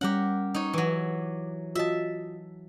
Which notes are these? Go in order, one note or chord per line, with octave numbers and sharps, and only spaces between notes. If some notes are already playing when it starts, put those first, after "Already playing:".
G3 C#4 G4 A#4 F#5
D#4 C#5
E3 F#3 D6
F4 F#4 D#5 E5 A5